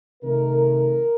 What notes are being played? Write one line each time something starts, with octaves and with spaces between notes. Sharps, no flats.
C3 D#3 A3 A#4